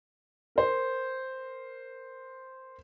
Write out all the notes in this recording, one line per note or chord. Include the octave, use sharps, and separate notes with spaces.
A#4 C5